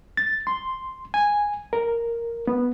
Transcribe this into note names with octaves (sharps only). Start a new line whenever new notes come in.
A6
C6
G#5
A#4
B3